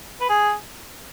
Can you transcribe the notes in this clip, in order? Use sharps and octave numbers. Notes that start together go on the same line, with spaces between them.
B4
G#4